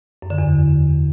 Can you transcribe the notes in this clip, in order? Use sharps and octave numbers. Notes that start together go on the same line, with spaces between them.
F#2
D3
E2